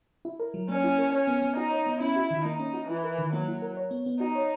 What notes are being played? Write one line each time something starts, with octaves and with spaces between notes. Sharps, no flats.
E4
A#4
F#3
A#3 C#4
E4
A#4
C#4 C#5
B3
B3
D#4 F#4
C#5
B3
C#4 E4
F#4
D#3
A#3 D#4
C#4
F#4
E3 E4
A#4
D#3
F#3 A#3
E4
A#4
C#5
B3
B3
D#4 F#4
C#5